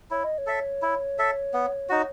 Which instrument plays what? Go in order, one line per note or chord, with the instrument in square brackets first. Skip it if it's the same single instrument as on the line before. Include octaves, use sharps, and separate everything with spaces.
[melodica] E4 [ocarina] C#5
[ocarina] D#5
C#5
[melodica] A4 E5
E4
A4 E5
B3
D#4 F#4